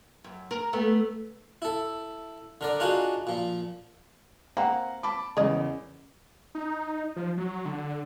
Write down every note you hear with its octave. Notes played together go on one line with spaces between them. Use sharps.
F#2
A#4
A3 B3
E4 A4
D3 A#4 D5
D4 D#4 F4 F#4 G#4
A#2 F3
A#3 C4 F5 F#5 A#5
A5 B5 D6
E2 C#3 A#4 C#5 D#5
D#4
F3
F#3
D3